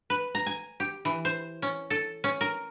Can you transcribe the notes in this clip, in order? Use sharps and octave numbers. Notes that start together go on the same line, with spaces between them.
B4
A#5
G#5
G4
E3
C5
C#4
A4
C#4
A#4